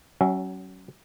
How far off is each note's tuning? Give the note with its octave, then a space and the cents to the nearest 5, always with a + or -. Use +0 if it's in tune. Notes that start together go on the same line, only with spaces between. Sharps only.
F#3 +25 C#4 +0 E5 +0